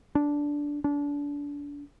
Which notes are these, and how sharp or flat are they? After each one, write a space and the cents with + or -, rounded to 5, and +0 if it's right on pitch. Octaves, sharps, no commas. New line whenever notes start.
D4 -10
D4 -30